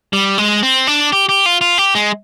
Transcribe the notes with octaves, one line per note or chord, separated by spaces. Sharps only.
G3
G#3
C4
D4
G4
G4
F4
F4
G4
G#3